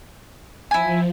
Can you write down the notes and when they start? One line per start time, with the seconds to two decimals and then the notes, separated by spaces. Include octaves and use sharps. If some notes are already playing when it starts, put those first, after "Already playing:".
0.71 F3 E4 G#5